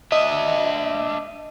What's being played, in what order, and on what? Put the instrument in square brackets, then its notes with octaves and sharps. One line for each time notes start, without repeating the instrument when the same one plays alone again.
[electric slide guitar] D4 E5 [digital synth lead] D#5